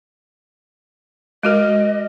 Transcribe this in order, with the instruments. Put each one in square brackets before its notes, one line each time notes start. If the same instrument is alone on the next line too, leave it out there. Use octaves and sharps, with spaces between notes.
[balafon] G#3 F#4 A#4 [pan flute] D#5